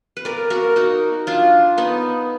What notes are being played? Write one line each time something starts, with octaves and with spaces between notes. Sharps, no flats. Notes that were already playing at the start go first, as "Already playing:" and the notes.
B4
A#4 D5
F#4 A#4
D#4 F#4
D4 F4
B3 D#4